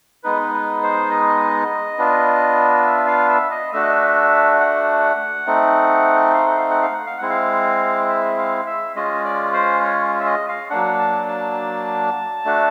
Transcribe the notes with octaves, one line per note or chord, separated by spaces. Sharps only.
G#3 B3 D#4 B4
B4
C5
D#5
B3 D4 F4
E5
F5
E5
D#5
A3 D4 F#4 E5
D#5
E5
F#5
A3 C4 D#4
F5
F#5
F5
F#5
F5
F#5
F5
G#3 C4 E4 F#5
F5
E5
F5
E5
G#3 C#4 F4 D#5
D5
C5
C#5
E5
D#5
F5
F#3 A#3 D4 F#5
A5
A5
A3 D4 F#4